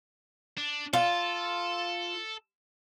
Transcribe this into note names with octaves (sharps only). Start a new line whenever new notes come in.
D4
F4 A4